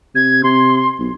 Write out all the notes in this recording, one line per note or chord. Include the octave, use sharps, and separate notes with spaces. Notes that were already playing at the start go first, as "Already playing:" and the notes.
C3 G#6
C3 C6
B1